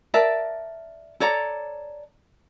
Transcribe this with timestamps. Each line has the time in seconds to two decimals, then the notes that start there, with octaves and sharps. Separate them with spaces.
0.14 A#4 D5 E5 A5
1.20 A4 C#5 D5 A#5